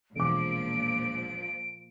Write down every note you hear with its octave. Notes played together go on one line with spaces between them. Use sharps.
E1 A#2 F3 D6 D7